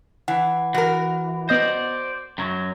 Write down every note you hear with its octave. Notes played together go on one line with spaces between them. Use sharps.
E3 F#5
E3 F#4 A#4
B3 C5 D5 D#5 A#6
F#2 F#3